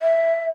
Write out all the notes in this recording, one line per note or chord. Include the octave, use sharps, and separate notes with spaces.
E5